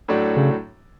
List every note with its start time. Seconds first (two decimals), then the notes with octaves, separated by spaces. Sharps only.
0.08 A2 F#3 A3 D4
0.37 C#3